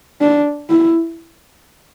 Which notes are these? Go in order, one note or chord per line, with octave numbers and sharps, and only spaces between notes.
D4
E4